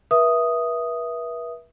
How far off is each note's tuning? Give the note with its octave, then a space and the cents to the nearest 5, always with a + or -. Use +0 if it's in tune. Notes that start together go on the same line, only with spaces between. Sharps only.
B4 -40 E5 +0 D#6 +0